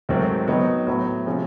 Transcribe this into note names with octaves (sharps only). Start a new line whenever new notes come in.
G#2 D#3 F#3 A3 C4
D#3 F#3 B3 D#4
A2 F#3 B3
C3 F3 G#3 C#4